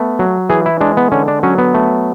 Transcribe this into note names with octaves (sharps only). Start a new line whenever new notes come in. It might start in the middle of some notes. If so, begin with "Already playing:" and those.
Already playing: A3 B3
F#3
E3 G#4
E4
G#3 D4
B3
D3 C#4
D4
F#3 C#4
B3
A3